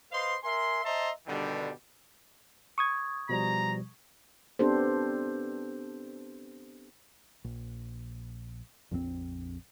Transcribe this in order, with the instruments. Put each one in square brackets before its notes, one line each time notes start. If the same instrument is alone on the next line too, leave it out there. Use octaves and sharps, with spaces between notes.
[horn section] B4 C5 D#5 F5 C6
A#4 E5 G#5 C6
C5 D#5 E5 A5 A#5 C6
G2 B2 D3 D#3 G3
[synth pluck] C#6 D#6 G#6
[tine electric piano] B2 F3 G3 [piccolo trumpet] A#5
[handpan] B3 C4 D4 G4 A4 C5
[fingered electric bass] A#1
A#1 F2 D#3 C4